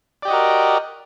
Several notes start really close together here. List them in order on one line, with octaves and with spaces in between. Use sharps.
D5 G4 D#5 F#4 A#4